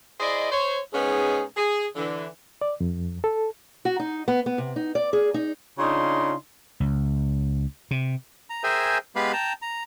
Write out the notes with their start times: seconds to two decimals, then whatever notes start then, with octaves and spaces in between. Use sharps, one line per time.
0.20 E4 G#4 C5 D5 D#5
0.51 C5 C#5
0.93 G#2 B3 C#4 D#4 G#4
1.57 G#4
1.96 D3 E3
2.61 D5
2.80 F2
3.24 A4
3.85 F#4
4.00 D#4
4.28 B3
4.46 B3
4.58 C3
4.76 D#4
4.95 D5
5.13 G#4
5.34 D#4
5.78 C#3 D4 D#4 F4 C6
6.80 C#2
7.91 C3
8.50 A#5
8.64 G#4 A#4 C5 E5 G5 G#5
9.16 G#3 B3 G4 B4 F5 B5
9.33 G5 A5 A#5
9.62 A#5